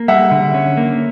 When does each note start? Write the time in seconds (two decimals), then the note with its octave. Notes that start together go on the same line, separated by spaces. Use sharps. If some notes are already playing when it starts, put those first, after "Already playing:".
Already playing: A#3
0.08 G3 E5 F#5
0.31 D3
0.54 C#4
0.77 A#3